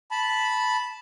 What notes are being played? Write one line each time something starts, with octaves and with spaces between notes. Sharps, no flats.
A5 B5